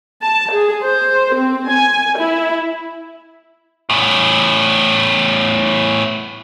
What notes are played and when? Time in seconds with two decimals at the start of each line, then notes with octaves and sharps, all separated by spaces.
0.22 A5
0.52 G#4
0.83 C5
1.35 C4
1.69 G#5
2.19 E4
3.90 E2 A2